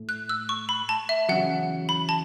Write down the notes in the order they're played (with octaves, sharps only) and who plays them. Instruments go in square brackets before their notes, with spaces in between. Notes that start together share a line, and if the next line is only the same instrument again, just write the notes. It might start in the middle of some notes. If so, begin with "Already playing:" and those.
Already playing: [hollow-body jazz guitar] A2 A3
[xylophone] F#6
E6
C#6
B5
A5
E5
[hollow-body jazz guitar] E2 C#3 F#3 [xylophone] F#5
[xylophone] B5
A5